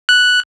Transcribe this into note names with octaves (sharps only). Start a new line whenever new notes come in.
F#6